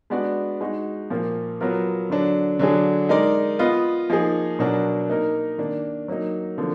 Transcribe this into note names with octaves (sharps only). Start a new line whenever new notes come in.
G#3 B3 D4 F#4 D5
G#3 D#4 F#4
A#2 F3 A#3
F#3 B3 F4 A#4
D3 F#3 D4
D3 F#3 D4 G#4
G#3 D#4 A#4 D5
B3 F4 B4 D#5
F3 A#3 D#4 G#4
B2 F#3 D4 F#4 A#4
A#3 D#4 A#4
D#3 A#3 D4
F#3 A#3 D#4
D3 F3 A#3